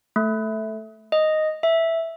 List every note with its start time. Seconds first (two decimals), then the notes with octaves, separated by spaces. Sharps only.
0.16 A3
1.12 D#5
1.63 E5